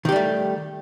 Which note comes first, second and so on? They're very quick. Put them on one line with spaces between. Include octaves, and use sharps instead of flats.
D#3 G4 G3 A3